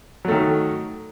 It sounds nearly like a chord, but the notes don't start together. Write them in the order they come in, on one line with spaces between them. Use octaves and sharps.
F#3 A3 D#3